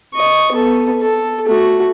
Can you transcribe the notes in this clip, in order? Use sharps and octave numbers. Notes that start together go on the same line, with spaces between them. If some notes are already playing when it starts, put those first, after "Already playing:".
D#5 C#6
B3 A4
A4
A3 F#4